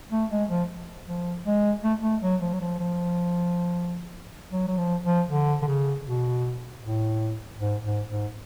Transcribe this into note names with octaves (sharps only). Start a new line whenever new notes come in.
A3
G#3
F3
F3
G#3
A3
A3
F#3
F3
F#3
F3
F3
F#3
F#3
F3
F3
D3
D3
C#3
B2
A2
G#2
G#2
G#2